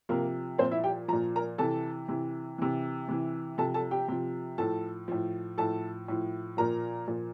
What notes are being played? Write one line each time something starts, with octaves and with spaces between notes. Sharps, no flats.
C3 F3 A#3 A#4
A#2 F3 C4 C5
E4 E5
G4 G5
A#2 F3 A#5
A#4 A#5
C3 E3 A4 A5
C3 E3
C3 E3
C3 E3
C3 F3 A4 A5
A4 A5
G4 G5
C3 F3
A2 F3 A4 A5
A2 F3
A2 F3 A4 A5
A2 F3
A#2 F3 A#4 A#5
A#2 F3